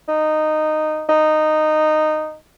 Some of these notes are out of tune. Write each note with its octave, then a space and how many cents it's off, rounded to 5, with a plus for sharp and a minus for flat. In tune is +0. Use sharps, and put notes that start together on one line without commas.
D#4 -10
D#4 -10